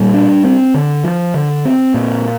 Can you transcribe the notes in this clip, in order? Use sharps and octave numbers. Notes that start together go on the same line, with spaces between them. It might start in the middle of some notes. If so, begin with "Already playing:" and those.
Already playing: A#2 G3
D4
C4
D3
F3
D3
C4
A#2